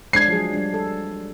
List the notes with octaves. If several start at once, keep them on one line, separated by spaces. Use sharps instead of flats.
G#3 D4 G#6 C7
F3 F#3 G#4
G3 D4
A4